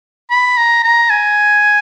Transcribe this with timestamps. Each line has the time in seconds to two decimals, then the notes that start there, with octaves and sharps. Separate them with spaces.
0.30 B5
0.57 A#5
0.83 A#5
1.10 G#5